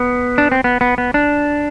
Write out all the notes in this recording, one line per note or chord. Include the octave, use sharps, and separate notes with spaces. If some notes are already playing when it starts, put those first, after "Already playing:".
Already playing: B3
D4
C4
B3
B3
B3
D4